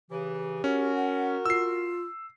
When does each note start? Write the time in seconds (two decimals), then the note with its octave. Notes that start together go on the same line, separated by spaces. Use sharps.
0.11 C#3 E3 G4
0.64 C#4 F#4 A#4
0.95 F#5
1.45 F4 E6 C7